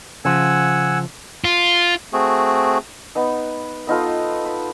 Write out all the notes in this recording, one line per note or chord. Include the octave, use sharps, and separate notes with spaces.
C#3 F3 F#5 G#5 E6
F4
A3 C4 F#4 G#4
B3 D#4
B3 D#4 F4 A4
B5